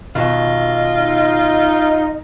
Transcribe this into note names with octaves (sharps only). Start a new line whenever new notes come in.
B2 D#3 F4 D#5
D#4